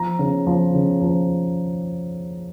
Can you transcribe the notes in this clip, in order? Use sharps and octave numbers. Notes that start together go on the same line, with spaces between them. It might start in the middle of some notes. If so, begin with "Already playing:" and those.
Already playing: F3 A#5
C#3
F3
C#3
F3